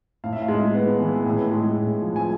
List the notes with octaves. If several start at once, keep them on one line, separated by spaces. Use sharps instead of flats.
A2 F5
E5
F5
G#3
B3
E3
A2
G#3
A2
F3
G#5